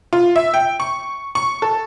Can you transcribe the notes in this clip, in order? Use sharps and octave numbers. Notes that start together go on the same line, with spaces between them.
F4
E5
G5
C#6
C#6
A4